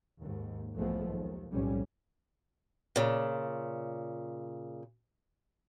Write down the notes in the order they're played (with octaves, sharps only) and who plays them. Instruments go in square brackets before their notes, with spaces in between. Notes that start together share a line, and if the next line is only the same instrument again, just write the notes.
[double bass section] D#2 G#2
B1 E2 F3 G#3 A3 B3
D#2
B1 F2 A2 G3 C#4
[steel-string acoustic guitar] A#2 C#3